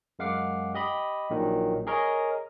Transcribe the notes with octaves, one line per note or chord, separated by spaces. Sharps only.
F#2 G#3 F5 F#5 D6 C7
G4 D#5 B5
A#1 A#2 D#3 F#3
G#4 A#4 C#5 D#5